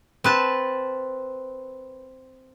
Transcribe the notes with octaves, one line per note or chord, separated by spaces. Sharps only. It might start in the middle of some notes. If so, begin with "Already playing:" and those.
C4 B4 A5